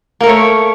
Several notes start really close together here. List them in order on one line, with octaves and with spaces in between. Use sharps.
A#3 A#4 A3 C#5